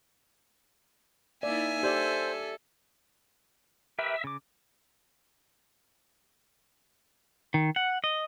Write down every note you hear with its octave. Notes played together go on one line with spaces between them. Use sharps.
A#3 D#4 E4 D5 E5 G#5
G4 A4 C5 D5
G4 A#4 B4 E5
C#3 D6
D#3
F#5
D#5